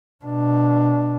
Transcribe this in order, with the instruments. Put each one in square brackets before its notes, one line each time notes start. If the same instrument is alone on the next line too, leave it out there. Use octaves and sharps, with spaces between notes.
[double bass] B2 D4